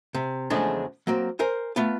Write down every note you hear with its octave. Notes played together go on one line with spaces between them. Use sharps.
C3
E2 C#3 F3 G#3 A3 D4
F#3 A#3 C4
A#4 C5 G#5
A3 B3 F4